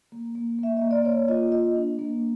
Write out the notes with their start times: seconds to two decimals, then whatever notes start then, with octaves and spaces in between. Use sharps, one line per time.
0.12 A#3
0.35 A#3
0.59 A#3 E5
0.77 A#3 D#5
0.91 D5
1.05 A#3 C#5
1.28 F4 D#5
1.51 A#3 D#5
1.76 D4
1.99 A#3